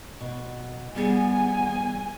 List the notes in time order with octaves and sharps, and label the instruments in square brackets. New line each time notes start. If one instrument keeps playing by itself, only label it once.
[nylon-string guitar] B2
[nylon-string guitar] G3 G#4 [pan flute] B3 [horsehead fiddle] G#5